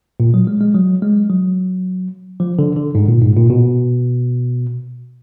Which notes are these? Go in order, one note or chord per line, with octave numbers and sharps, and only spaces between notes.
A#2
F#3
G#3
G#3
F#3
G#3
F#3
F3
D3
D3
G#2
A#2
G#2
A#2
B2